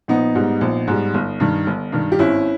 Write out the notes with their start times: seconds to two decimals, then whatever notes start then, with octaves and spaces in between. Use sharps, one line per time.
0.08 A#1 B3 D#4
0.35 G#2 G3
0.61 A#1
0.88 G#2 G3
1.14 G1
1.40 G2 D#3
1.67 G1
1.92 G2 D#3
2.12 G4
2.19 G#1 C#4 E4